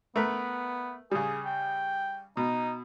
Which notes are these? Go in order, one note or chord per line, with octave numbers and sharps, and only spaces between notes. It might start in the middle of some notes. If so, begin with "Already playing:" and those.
A3 B3 A#4 B4
C#3 G3 G#4
G5
B2 D#4